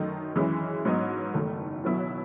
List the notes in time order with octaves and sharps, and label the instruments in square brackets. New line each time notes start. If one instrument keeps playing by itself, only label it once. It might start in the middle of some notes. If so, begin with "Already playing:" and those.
Already playing: [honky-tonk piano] F#2 D#3 A3 D#4
F#2 E3 G#3 C#4 E4
G#2 F#3 B3 D#4
F#1 E2 D#3 A3
B1 B2 F#3 B3 E4